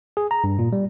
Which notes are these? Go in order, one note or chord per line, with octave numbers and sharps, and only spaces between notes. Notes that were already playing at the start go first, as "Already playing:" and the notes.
G#4
A#5
G2
A#2
G3